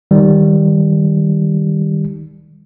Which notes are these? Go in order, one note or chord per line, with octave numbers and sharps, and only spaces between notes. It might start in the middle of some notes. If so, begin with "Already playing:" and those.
D#3 G3